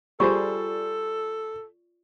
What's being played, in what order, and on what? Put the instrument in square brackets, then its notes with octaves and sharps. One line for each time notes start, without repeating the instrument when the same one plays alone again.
[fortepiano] G3 G#4 C5 [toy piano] F4 D5 C#6 [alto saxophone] A4